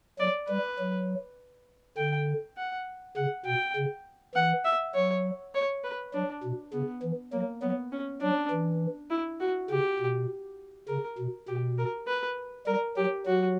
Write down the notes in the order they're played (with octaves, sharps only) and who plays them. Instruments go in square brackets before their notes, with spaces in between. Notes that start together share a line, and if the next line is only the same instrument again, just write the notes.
[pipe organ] F#3 [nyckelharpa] D5
[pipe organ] G3 [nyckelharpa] B4
[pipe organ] F#3
[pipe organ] D3 [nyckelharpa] G5
[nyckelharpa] F#5
[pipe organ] C#3 [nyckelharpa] F#5
[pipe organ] B2 [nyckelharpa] G5
[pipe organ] C#3
[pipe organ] E3 [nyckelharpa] F#5
[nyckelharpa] E5
[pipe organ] F#3 [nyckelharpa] C#5
[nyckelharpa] C#5
B4
[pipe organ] F#3 [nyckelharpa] D4
[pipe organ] B2
[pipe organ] C#3 [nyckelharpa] B3
[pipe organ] E3
[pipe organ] F#3 [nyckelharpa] A#3
[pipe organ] F#3 [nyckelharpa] B3
[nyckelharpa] C#4
[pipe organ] F#3 [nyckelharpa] D4
[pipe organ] E3
[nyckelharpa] E4
F#4
[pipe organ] C#3 [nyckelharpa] G4
[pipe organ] B2
[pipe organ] C#3 [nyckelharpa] A#4
[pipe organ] B2
[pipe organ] B2 [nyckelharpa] G4
[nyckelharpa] A#4
B4
[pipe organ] G3 [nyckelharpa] A#4
[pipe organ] F#3 [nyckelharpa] G4
[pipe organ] F#3 [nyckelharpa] F#4